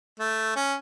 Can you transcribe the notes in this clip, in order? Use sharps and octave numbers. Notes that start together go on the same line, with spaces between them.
A3
C#4